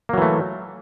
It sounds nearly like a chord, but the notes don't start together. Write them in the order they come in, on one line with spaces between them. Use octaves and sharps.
A#3 F#3 E3 A3